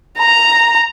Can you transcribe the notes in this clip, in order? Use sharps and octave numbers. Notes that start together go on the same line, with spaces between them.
A#5